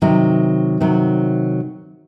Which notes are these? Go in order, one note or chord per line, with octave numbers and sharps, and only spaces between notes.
C3 D#3 F#3
C3 D#3 F#3